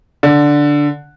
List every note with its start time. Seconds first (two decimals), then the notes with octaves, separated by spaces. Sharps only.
0.23 D3